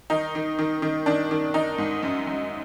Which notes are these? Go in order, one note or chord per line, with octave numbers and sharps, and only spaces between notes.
D#3 D#4
D#3
D#3
D#3
D#3 D4
D#3
D#3 D#4
G#2
F#2
F#2